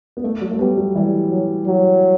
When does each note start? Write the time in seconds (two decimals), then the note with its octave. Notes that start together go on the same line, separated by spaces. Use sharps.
0.17 B3
0.24 A3
0.41 F#3
0.51 A3
0.59 G3 B3
0.78 F#3
0.95 E3 G3
1.31 F#3
1.67 F#3